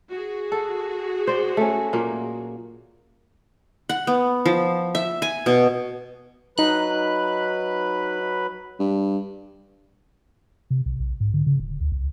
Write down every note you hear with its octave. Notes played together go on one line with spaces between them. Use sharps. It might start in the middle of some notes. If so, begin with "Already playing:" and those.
F#4 G#4
A4
C5 D5
A3 C#4
A#2 F#3 A#3
F#5
B3
F3
E5
G#5
B2
F#3 D#4 B4 B5 F#6
G2
C3
B1
B1
G#2
D3
C#3
D#1
D2
C2